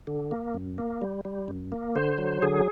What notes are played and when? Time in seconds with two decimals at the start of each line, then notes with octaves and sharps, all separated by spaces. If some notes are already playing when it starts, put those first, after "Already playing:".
0.07 D3
0.31 A#3
0.54 F#2
0.78 A#3
1.02 G3
1.25 G3
1.48 F#2
1.72 A#3
1.96 D3 C5
2.18 F#3
2.42 D3 G#4